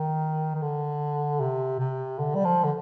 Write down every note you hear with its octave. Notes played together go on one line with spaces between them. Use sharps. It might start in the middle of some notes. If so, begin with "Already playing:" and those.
Already playing: D#3
D#3
D3
C3
C3
D3
G3
F3
D3